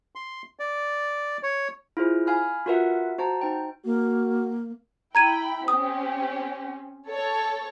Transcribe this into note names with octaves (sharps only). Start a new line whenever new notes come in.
C6
D5
C#5
E4 F4 G#4 C5
F5 G#5 B5 F6
F4 F#4 A#4 B4 E5 F#5
F#4 C5 A5 A#5
D#4 C5 G5
A#3 F#4
E4 G5 A#5 B5 G#6 D#7
C4 C#4 G4 D#6
A4 C#5